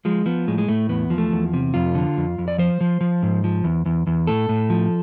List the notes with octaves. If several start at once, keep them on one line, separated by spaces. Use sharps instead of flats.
F3 G#3
F3 B3
A2 G#3
G#3
A2 A3
E2 B3
F3
A3
E2
C3
F2 F4
D3
F2
F2
D5
F3 C5
F3
F3
G#2
F3
E2
E2
E2
A2 A4
A2
F3